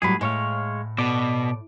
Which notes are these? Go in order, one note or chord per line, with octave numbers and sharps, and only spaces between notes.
A2 F#3 G3 G#4 B5
A2 G#3 C#5 F5
B2 A4 D5